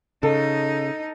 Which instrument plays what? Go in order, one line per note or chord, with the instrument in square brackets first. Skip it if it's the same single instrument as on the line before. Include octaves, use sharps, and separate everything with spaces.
[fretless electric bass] C#3 [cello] D#4 [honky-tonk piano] A4